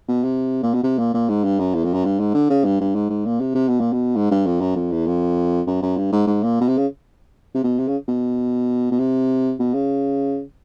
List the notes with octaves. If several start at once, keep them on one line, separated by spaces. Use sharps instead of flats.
B2
C3
A#2
B2
C3
A#2
A#2
G#2
G2
F#2
E2
F2
F#2
G2
G#2
D3
C#3
G2
G2
G#2
G#2
A#2
C3
C3
B2
A#2
B2
G#2
G2
F2
F#2
F2
E2
F2
F#2
F#2
G2
G#2
G#2
A#2
B2
C3
C#3
C3
B2
C3
C#3
B2
B2
C3
B2
C#3